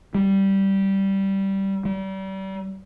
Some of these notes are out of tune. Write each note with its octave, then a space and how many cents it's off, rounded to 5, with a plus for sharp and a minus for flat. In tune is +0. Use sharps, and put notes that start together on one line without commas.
G3 -10
G3 -35